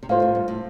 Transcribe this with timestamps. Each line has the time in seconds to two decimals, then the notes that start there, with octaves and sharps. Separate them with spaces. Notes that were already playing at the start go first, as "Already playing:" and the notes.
0.03 C3
0.09 A2 A3 F4 C5 F5
0.22 C3
0.35 G2
0.48 A2